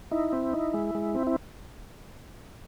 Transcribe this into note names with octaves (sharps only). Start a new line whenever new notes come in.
D#4 E4
C4
D#4
G#3
G#3
C4
E4